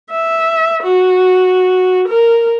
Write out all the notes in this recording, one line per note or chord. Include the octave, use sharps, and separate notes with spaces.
E5
F#4
A#4